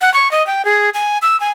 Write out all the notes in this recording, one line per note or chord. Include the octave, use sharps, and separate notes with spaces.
F#5
C#6
D#5
G5
G#4
G#5
E6
G#5